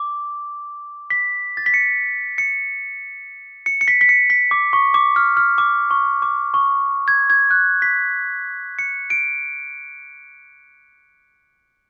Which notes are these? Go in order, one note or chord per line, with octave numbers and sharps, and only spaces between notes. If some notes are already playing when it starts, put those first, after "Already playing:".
Already playing: D6
B6
A6
B6
C#7
C#7
C#7
C#7
B6
B6
C#7
B6
D6
C#6
D6
F6
F6
D6
C#6
D6
C#6
G#6
G#6
F#6
B6
C#7
D7